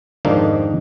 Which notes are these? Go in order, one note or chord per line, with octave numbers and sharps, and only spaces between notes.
F2 G#2 D#3 A#3 D4 D#4